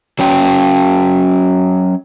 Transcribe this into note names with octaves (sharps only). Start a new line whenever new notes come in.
F#3 C#4 G5